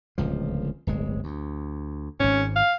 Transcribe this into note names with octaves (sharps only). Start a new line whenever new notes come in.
D1 C#2 F3
D1 G1 G#3
D2
G#1 G#2 C#4
F5